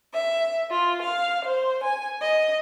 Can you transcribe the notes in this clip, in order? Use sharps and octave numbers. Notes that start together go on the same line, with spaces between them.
E5
F4
F5
C5
G#5
D#5